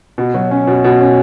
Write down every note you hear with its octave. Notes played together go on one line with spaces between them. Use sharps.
B2
F#3
C#4
B2
B2
C#4